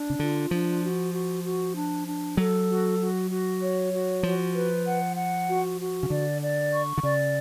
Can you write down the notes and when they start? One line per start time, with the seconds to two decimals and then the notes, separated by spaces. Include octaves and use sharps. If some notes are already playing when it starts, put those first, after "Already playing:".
Already playing: D4
0.10 C#3
0.19 D3 F4
0.51 F3 D4
0.82 F#4
1.13 F#4
1.44 F#4
1.76 D4
2.06 D4
2.37 F#3 A4
2.69 F#4
3.00 F#4
3.30 F#4
3.61 C#5
3.93 F#4
4.23 F3 F#4
4.55 B4
4.86 F#5
5.17 F#5
5.47 F#4
5.79 F#4
6.03 C#3
6.10 D3 D5
6.41 D5
6.72 C#6
6.98 D3
7.03 C#3 D5